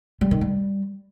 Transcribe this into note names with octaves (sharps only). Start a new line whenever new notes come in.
G3
D#3
G3